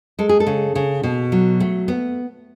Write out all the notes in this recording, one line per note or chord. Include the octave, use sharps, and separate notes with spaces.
G#3 A4
G#4
A4
C#3
C#3
B2
F#3
A3
B3